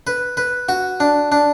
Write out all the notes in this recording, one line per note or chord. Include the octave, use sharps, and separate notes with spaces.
B4
B4
F#4
D4
D4